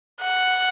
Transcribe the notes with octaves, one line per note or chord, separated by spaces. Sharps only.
F#5